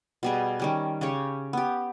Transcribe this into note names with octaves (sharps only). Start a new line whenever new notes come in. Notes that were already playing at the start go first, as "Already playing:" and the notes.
B2 G3 G#4
D#3 G3 C#4
C#3 C#4 G4 C#5
B3 G4